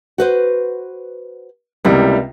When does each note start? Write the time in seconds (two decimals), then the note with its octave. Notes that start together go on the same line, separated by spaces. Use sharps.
0.18 F#4 B4 C5
1.85 C#2 C3 G3 A#3 E4